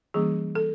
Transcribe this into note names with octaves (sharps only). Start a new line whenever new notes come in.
E3 G3 A#3 C#4 G#4
A4